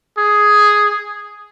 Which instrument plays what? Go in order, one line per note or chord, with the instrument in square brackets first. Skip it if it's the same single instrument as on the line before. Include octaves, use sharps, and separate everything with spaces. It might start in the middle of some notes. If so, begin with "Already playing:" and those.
[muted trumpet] G#4